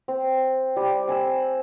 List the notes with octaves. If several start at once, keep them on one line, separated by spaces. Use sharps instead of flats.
C4
G3 G4
C4 G#5 B5 E6